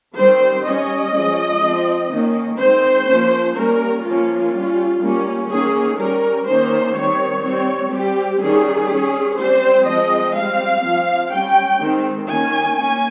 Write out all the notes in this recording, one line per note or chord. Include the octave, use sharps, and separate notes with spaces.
D#3 G3 C4 C5
G3 C#4 D#5
F3 G#3 C#4
F3 C4
D#3 A#3 C#4
D#3 G#3 C4 C5
F3 A#3 C#4
G3 A#3 C#4 A#4
F3 A#3 C#4 F4
G3 C#4
G3 A#3 C#4
D#3 A#3 C#4 G#4
G3 C#4 A#4
D#3 A#3 C#4 C5
D#3 G3 C4 C#5
G3 C4 C#5
G3 C4 G4
D#3 G3 C#4 G#4
G3 C#4
G3 C4 C5
F3 G#3 C4 D#5
G3 C4 F5
F3 C4
G3 C#4 G5
D#3 G#3 C4
D#3 A#3 C#4 G#5
A#3 C#4 G#5